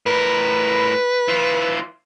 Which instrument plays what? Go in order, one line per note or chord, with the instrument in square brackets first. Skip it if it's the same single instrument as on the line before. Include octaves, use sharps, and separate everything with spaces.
[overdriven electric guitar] A2 A#4 [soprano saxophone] B4
[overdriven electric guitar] E3 F4